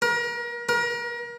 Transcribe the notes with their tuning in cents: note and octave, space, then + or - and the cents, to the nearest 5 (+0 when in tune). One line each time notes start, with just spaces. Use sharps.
A#4 +35
A#4 +35